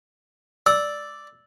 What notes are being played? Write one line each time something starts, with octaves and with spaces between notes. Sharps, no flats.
D5 E6